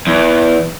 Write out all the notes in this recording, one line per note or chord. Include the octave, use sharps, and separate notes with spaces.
E2